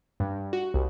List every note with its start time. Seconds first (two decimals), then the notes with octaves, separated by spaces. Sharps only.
0.20 G2
0.53 F#4
0.74 C2